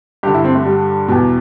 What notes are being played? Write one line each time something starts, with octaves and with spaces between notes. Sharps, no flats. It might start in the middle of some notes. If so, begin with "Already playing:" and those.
G2 D3 G4
E4
C4
A3
G3
E2 B2